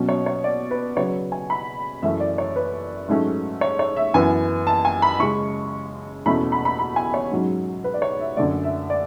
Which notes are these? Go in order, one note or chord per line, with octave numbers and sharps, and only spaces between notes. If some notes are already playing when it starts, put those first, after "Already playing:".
Already playing: B2 F#3 C#4
C#5
C#5
D5
B4
C#3 F#3 B3 C#5
G#5
B5
F#2 E3 A3 C#4 E5
D5
C#5
B4
G#2 F#3 A3 C#4
C#5
C#5
E5
F#2 E3 B3 G#5
A5
G#5
B5
C#3 G#3 C#4 C#6
E2 B2 A3 C#4 B5
B5
B5
B5
G#5
C#5
G#2 F#3 C#4
B4
D5
C#5
E5
F#2 D3 A3 D5
E5
D5